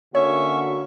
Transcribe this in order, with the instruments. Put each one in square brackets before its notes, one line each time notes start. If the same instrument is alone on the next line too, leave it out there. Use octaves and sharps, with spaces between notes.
[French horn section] D3 A#3 F#4 [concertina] C#4 E5 C#6 [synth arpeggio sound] C#5